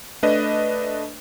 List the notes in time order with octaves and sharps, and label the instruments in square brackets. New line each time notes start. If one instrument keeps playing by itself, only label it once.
[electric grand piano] A3 D4 B4 D#5